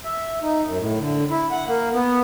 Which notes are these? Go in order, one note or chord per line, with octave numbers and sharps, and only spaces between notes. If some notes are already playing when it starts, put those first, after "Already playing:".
E5
D#4
F#2
A2
D3
E4
F#5
A#3
B3